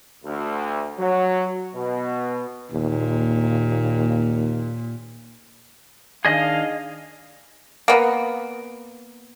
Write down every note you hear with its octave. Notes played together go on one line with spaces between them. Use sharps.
D2
F#3
B2
D#2 A#2
D#3 D4 G#4 D#5 F5
A#3 B3